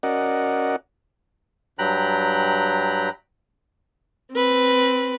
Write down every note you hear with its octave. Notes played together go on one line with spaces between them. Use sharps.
C#4 F#4 A#4 D5 D#5 F#5
G2 F#3 G5 A#5 B5 F#6
C4 B4